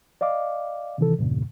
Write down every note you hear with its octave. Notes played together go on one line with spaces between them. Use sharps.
D5 D#5 F5 D6
C3 D#3 E3 A4
E2 G2 A#2 C#3